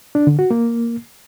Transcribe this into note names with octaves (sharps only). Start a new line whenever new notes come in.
D4
D3
F#4
A#3